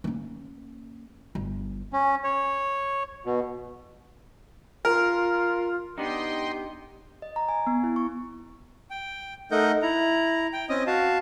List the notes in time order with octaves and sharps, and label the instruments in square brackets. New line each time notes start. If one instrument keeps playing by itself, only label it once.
[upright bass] A#3 C#4
G1
[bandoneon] C#4
C#5
B2
[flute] F4 [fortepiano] A#4
[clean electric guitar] B3 D4 D#4 [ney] G4 [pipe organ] D#5 G5 C6
[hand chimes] D#5
A#5
G#5
B3
E4
C#6
[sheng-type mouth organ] G5
A3 D#4 A#4 D#5 F#5 G6
E4 A#5
G5
C4 C#4 D#5 D#6
F#4 F5 A5